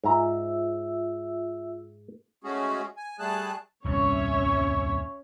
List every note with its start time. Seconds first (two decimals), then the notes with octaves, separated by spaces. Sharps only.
0.04 G#2 F4 E5 A#5 E6
2.44 G#3 A3 C#4 F#4 G#4
2.97 G#5
3.19 G3 A3 G#4 A5 F#6
3.84 D#1 C2 G2 C#4 C#5 E5